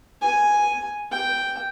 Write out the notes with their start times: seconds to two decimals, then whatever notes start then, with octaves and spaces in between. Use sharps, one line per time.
0.22 G#5
1.12 G5